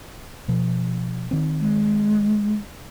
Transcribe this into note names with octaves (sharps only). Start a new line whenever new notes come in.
B2 F3
D#3 C4
G#3